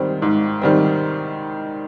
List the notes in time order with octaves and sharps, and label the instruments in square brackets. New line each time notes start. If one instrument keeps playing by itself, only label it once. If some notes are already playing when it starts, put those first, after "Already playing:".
Already playing: [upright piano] G#2 D#3 G3 C4
G#2
D#3 G3 C4